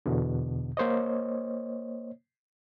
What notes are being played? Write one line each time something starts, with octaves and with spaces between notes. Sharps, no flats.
E2 B2 D3
A#3 C5 C#5 D#5